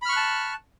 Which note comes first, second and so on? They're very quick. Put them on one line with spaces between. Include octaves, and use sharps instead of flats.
B5 F6 C#6 F#6 A5